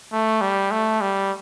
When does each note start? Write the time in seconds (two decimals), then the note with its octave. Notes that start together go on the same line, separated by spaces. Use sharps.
0.12 A3
0.41 G3
0.71 A3
1.01 G3